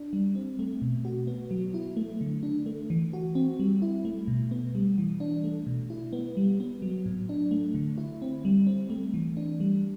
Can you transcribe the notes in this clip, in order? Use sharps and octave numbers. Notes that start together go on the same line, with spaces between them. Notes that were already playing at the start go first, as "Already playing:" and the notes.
Already playing: D4
G3
C4
A3
B2
F#4
B3
F#3
E4
A3
D3
D4
A3
E3
F#4
C4
G3
E4
A3
B2
B3
G3
E3
D4
A3
B2
E4
B3
G3
B3
F#3
A2
D4
A3
D3
E4
C4
G3
C4
A3
E3
D4
G3